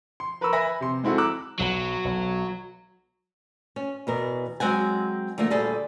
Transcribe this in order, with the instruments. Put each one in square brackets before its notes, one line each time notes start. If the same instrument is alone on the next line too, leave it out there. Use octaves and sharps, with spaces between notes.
[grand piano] C6
A#4 B4 A#5 B5 C#6 E6
B4 E5 G#5 B5 A#6
C3 C6
G#3 C4 E4 F#4 A4
A#5 D6 E6 F#6
[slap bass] B1 [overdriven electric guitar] F#3
[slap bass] B1
[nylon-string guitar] C#4
E2 B2 A#4
F#3 G#3 C4 F#5 G#5
D3 F3 A3 A#3
D2 A#2 G3 G#4 A4